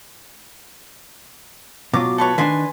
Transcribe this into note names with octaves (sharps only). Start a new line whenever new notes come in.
B2 F#3 F4 D6
A4 B4 C#5
D#3 D4 B4 G#5 C6